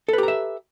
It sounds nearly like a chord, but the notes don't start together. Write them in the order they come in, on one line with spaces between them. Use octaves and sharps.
A4 B4 G4 A#5 E5